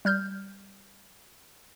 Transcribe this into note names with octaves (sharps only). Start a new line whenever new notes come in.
G3 F6 G6